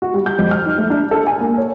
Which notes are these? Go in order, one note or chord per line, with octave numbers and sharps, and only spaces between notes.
F#4
G3
G6
F2
F6
D#4
A3
D4
A4
G#5
A#3
C#5